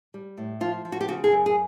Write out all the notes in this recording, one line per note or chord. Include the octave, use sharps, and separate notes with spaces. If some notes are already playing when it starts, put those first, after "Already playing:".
G3
A2
F3 F4
F3
F#4
G4
C#3 F#4
G#4
F#2
G#4